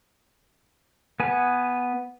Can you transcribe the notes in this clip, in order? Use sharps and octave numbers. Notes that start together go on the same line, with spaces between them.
B3 G#5